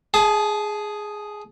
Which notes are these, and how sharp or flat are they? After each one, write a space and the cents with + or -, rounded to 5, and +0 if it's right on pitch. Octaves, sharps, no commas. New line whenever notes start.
G#4 +0 A5 -30